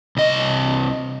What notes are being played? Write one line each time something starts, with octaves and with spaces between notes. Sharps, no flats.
C2 D#5